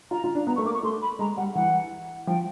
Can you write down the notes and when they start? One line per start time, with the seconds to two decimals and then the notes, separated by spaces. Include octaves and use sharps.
0.11 F4 A#5
0.24 F4
0.35 D4
0.47 B3 A#5
0.56 A3 C#6
0.65 A#3 D6
0.74 C#6
0.83 A3 C6
1.02 B5
1.19 G#3 A#5
1.37 G3 F#5
1.55 E3 F#5
2.27 F3 G5